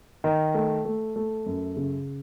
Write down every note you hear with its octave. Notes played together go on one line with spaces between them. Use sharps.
D#3
A3
A3
A3
F#2
C#3